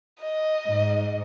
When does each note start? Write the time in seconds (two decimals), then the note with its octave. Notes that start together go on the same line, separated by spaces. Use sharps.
0.20 D#5
0.68 G#2